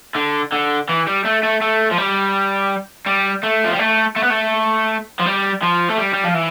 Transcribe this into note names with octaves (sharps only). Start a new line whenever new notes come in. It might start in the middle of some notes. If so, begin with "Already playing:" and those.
D3
D3
E3
G3
A3
A3
A3
F3
G3
G3
A3
F3
G3
A3
A3
B3
A3
F3
G3
F3
A3
G3
G3
F3
E3